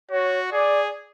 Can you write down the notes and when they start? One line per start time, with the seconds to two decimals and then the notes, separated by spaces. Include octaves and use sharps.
0.11 F#4 C#5
0.52 G#4 D5